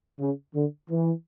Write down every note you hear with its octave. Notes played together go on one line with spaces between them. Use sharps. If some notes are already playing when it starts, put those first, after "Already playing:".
C#3
D3
E3